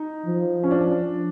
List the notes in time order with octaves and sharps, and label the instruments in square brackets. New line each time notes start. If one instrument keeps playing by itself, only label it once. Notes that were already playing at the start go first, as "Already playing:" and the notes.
Already playing: [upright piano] D#4
[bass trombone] F3
[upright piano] C#4
D4